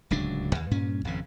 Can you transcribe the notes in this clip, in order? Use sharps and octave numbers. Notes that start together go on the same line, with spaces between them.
D1 C#2 F#3 D4
D#2
G2 A#2 C#4
G#1 F2 C#3